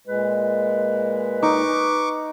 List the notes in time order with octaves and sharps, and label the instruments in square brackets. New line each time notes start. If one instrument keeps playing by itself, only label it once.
[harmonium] A#2 G#3 [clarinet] B4
[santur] D#4 [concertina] C#6 D6